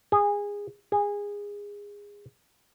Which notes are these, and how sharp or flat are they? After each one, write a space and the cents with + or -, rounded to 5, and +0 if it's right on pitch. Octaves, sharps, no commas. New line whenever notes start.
G#4 -20
G#4 -20